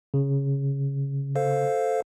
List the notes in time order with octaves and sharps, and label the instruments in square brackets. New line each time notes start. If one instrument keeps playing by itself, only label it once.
[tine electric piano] C#3
[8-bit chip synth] A4 C5 F5